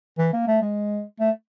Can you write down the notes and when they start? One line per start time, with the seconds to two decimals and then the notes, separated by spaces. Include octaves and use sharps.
0.18 E3
0.33 A#3
0.47 A3
0.62 G#3
1.20 A3